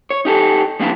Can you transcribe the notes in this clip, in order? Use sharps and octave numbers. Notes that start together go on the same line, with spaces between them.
C#5
D#4 G4 A4
F3 G3 A#3 B3 D4 E4